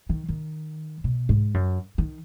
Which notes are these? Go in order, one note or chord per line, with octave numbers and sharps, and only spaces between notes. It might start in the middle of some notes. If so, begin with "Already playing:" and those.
D#3
D#3
B2
G#2
F#2
D#3